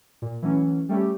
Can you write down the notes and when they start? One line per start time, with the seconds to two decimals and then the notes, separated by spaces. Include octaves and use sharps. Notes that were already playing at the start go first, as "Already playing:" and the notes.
0.22 A#2
0.42 E3 F#3 A3 C#4
0.89 G3 A3 C#4 G4